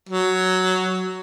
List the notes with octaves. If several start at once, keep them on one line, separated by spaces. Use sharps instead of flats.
F#3